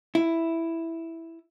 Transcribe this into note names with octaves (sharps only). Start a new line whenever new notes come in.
E4